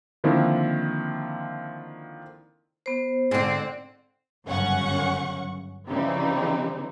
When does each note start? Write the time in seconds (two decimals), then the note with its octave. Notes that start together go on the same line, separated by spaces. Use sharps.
0.24 D3 D#3 F3 A#3 C4 E4
2.86 B3 C5
3.31 G#2 D3 C4
4.47 G1 F#2 C#3 C#4 F#5 C#6
5.89 C#3 E3 F3 G3 C4 D#4